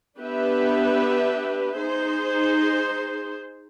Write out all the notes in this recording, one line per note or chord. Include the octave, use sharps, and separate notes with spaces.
B3 D4 G4 B4 E5
D#4 G#4 C5